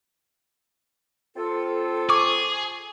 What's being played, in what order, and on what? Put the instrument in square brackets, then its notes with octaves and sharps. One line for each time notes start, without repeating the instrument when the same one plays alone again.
[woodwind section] C4 F4 A4
[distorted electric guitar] G#4 [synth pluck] C#6 D6